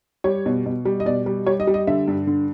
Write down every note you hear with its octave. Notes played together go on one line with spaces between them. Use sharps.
G3 C#5
B2
B2
G3
D#5
B2 D5
G3
G3 C#5
D#5
G3
D#5
D3 E5
G2
D3